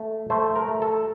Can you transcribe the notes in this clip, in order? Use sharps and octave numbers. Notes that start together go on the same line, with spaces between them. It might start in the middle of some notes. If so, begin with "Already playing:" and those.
Already playing: A3
A3 C5
A#4
A3
A4